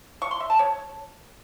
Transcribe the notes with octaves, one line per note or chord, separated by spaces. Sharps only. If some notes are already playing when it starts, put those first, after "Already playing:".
C#6
C6
E5
A5
C#5